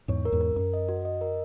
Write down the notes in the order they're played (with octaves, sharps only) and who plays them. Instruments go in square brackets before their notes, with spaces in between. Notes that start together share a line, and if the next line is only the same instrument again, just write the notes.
[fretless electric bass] E2 G#2 [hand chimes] C#5
[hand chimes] A#4
[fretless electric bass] E2 G#2
[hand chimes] A#4
[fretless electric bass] F#2 [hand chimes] A#4
[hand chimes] D#5
F#4
D#5
A#4